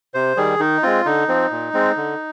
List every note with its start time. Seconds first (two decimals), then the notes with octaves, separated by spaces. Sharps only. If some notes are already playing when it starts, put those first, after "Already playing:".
0.14 C3 C5
0.37 D#3 G3 G#4
0.59 D#3 D#4
0.83 G#3 C4 F4
1.06 D3 D#4
1.28 F3 C4
1.51 A#2
1.74 G#3 C4
1.97 D3